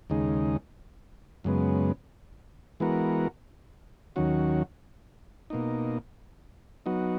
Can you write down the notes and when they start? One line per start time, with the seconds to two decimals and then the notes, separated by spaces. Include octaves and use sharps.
0.10 D#2 C#3 G#3 D#4
1.44 F#2 C#3 G#3 B3
2.80 E3 G#3 B3 F#4 A#4
4.16 D#2 D#3 F#3 C#4 F#4
5.50 B2 A#3 D#4
6.86 F#3 B3 D#4 F#4